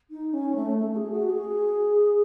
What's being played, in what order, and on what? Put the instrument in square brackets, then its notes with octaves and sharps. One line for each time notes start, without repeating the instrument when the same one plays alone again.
[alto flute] D#4
C#4
A3
A3
G#4
F#4
G#4